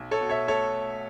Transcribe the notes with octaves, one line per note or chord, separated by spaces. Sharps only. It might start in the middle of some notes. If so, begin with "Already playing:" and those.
Already playing: B1
A4 C#5
B2
C#5 E5
A3 A4 C#5